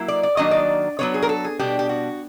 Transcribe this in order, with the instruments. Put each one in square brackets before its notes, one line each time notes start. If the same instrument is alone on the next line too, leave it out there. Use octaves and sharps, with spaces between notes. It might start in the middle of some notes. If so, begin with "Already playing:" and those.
Already playing: [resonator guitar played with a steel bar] F#3 A#3 E4
D5
D5
D#3 F#3 A#3 D4 D#5
D5
F#3 B3 D4 C#5
G#4
A#4
A4
G#4
B2 G3 B3 D4 G4
G4
F#4